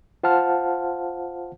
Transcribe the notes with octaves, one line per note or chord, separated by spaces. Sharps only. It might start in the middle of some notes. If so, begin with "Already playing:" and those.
F4 C5 F5 F#5 A5 F6